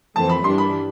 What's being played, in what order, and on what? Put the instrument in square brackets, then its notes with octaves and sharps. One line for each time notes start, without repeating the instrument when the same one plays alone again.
[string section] F2 E3 A3 C4 [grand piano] A5
[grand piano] B5
[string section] G2 E3 G3 D4 [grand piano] C6
[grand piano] B5